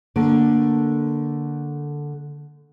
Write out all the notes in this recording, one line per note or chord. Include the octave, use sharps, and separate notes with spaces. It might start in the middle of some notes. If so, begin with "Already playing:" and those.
D3 A3 A#3